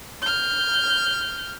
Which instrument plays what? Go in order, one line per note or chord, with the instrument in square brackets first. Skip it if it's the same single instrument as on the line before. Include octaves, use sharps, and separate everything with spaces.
[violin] F6 G6